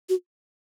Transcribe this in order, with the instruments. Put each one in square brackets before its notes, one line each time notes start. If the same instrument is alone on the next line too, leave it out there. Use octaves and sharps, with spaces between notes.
[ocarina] F#4